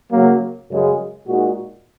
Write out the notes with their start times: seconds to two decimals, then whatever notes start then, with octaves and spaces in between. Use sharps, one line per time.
0.11 C#3 F#3 A#3
0.70 F#2 C#3 G#3
1.27 A#2 G#3 D#4 F#4